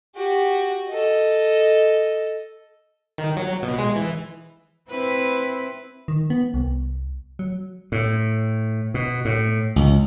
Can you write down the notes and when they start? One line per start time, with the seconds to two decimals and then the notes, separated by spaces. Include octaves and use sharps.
0.15 F#4 G4
0.89 A4 D#5
3.18 D#3
3.37 F#3
3.62 B2
3.78 G#3
3.96 E3
4.89 C4 E4 B4
6.08 D#3
6.30 B3
6.54 C2
7.39 F#3
7.92 A2
8.94 B2
9.25 A2
9.76 C#2